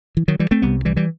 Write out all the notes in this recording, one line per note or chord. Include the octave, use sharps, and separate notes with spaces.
E3
D#3 F#3
E3 G3
A3 C4
C2 C3 G3 B3
E3 G3
E3 G3